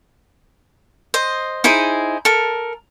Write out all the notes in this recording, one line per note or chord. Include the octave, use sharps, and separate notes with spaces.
C5 D#5
D#4 E4 G#4 C5
A4 A#4